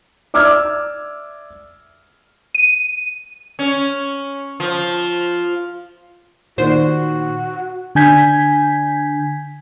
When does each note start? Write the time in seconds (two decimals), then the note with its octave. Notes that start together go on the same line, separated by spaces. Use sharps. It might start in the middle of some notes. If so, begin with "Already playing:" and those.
0.34 D5 E5 D6 E6 F6 G#6
2.55 D#7
3.59 C#4
4.60 F3
6.58 A#2 D#3 F#4 C5
7.95 D3 D4 G#5 G6 G#6 B6